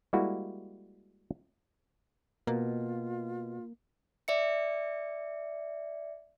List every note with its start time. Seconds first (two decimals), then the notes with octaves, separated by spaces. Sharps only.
0.13 G3 G#3 A#3 E4 F#4
2.47 B2 A#3 F4
4.28 D5 E5 C#7